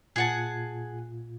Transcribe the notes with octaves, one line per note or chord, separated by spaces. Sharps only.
A#2 F4 G#4 F#5 A5